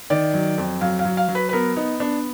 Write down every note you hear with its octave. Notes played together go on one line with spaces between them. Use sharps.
D#3 D5
F#3
F2
F#3 F5
F5
F#3
F5
F#3
B4
B4
B3 A#4
B3 D#4
B3 D4